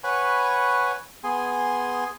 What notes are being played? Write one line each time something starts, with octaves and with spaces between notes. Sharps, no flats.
B4 C#5 F#5 G#5 B5 C#6
B3 G#4 G#5 C6